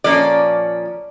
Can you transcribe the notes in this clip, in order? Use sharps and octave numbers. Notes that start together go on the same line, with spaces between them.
A#2 F3 A#3 C#4 D5